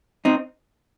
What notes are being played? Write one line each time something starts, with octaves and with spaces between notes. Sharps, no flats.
C4 D#4